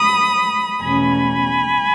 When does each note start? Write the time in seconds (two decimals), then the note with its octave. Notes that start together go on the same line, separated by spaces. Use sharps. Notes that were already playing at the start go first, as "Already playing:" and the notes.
Already playing: B5 D#6
0.83 E2 B2 A3 C#4 G#5 B5